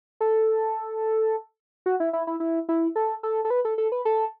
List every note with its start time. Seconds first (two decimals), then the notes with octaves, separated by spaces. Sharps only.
0.21 A4
1.86 F#4
2.00 E4
2.13 E4
2.27 E4
2.40 E4
2.69 E4
2.96 A4
3.23 A4
3.45 A4
3.50 B4
3.65 A4
3.78 A4
3.92 B4
4.05 A4